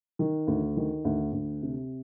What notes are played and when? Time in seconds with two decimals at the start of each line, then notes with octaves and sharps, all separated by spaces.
0.19 D#3
0.47 D2
0.77 D#3
1.05 D2
1.33 D2
1.62 C3